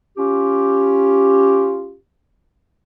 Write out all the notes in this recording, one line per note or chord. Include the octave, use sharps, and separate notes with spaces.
C#4 F4 G4